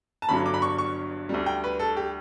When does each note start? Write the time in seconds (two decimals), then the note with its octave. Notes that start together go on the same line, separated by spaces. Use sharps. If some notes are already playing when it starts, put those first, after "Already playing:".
0.22 A5
0.28 G1 G2 D3 F#3 B5
0.46 D6
0.54 B5
0.62 C#6
0.79 C#6
1.29 D2 D3 G3
1.46 G5
1.64 B4
1.79 A4
1.97 G4